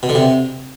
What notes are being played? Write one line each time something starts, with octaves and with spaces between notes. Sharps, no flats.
B2
D3
C3